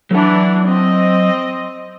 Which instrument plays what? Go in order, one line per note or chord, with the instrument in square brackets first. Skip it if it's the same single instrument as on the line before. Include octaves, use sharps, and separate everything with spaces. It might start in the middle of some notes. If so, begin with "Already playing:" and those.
[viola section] E3 D4 [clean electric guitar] F#3 F#5
[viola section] C4 D#5